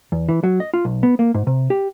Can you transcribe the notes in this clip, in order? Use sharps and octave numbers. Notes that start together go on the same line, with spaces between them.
E2
E3
F#3
D#5
F4
B1
B3
A#3
G#2
C3
G4